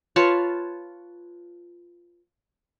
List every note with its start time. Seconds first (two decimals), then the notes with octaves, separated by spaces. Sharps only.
0.16 F4 B4 C#5 A5